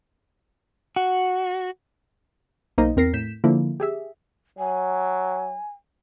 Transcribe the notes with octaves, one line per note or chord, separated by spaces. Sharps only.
F#4
B1 A#3 D#4 C5 D#5
E2 C4 A#4 A#6 C7
A2 G6 B6 E7
D3 F3 A#3 E4
G4 G#4 E5
F#3 G#5